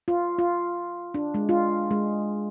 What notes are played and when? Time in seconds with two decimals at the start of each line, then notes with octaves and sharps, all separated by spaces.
0.08 F4
0.39 F4
1.14 D4
1.34 G#3
1.49 F4
1.91 G#3